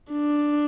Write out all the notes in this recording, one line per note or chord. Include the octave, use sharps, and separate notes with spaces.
D4